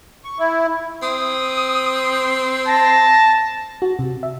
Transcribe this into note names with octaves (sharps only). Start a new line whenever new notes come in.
C#6
E4
C4 D#6
A5 A#6
F#4
C3
E5